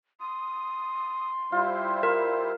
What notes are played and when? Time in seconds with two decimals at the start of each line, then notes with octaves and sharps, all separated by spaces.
0.20 C6 D#6
1.52 G3 E4 F4 C5
2.03 F4 A#4